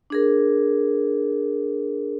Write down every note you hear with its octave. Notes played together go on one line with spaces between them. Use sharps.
D4 G#4 A#4